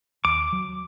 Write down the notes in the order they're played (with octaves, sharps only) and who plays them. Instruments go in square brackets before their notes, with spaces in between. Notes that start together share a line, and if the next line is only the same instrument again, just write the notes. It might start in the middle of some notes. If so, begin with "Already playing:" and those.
[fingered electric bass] D#2 [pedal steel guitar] D6
[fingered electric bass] F#3